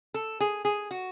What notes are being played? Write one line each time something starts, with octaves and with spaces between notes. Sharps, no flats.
A4
G#4
G#4
F#4